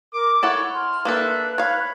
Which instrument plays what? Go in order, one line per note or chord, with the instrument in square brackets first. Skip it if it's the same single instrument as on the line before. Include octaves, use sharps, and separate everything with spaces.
[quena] A#4 [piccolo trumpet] D6
[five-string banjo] E4 A4 F#5 [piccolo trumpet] C#5 [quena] C#6
[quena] C6 [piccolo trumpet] F6
[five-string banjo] A#3 D4 A4 [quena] B4 [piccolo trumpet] E5
[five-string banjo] C#5 F5 [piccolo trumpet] B5